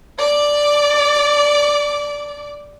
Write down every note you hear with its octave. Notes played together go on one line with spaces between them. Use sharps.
D5 D6